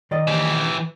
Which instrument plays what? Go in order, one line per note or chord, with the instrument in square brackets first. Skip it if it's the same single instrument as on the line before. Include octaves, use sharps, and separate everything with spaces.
[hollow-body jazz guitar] D#3 D5 D#5
[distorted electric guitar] E3 G4